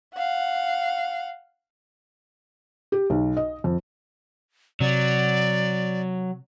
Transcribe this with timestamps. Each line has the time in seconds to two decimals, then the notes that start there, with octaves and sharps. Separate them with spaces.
0.14 F5 F#5
2.92 G4
3.10 B1
3.37 D#5
3.64 F2
4.81 C3 F#3 D5